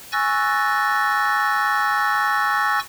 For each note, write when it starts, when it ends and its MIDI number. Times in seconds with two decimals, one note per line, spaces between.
0.12 2.79 80
0.12 2.79 85
0.12 2.79 88
0.12 2.79 90
0.12 2.79 93
0.12 2.79 94